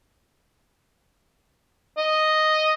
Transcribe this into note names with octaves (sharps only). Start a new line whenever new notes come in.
D#5